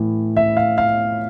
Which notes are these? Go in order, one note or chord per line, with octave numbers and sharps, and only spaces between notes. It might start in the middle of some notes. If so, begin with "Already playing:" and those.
Already playing: A2 E3
E5
F5
F5